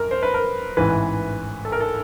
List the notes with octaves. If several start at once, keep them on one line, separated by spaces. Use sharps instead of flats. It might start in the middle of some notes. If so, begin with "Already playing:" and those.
Already playing: F#2 A#4
C5
B4
A#4
A1 G#2 E3 B4
A4
A#4
A4